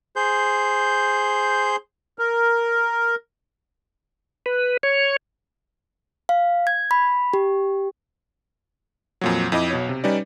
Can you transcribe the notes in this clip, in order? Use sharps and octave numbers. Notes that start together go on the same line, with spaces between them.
G#4 C5 G6
A#4
B4
C#5
F5
G#6
B5
G4
F2 A#2 F#3
F2 E4 D#5 D6
B1 B2 C#5
C3
G3 C#4 D#4 B4 D5